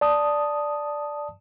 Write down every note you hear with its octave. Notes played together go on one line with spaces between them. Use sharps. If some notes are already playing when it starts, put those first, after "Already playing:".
D5 A5 D#6